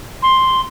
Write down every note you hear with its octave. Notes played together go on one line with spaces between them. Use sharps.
C6